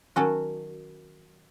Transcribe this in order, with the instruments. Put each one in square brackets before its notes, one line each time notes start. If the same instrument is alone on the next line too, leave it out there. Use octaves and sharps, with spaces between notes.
[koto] D#3 F#3 C#4 F#4 A4